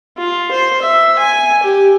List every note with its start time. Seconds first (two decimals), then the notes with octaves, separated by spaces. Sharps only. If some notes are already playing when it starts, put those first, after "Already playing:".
0.18 F4
0.51 C5
0.82 E5
1.18 G#5
1.63 G4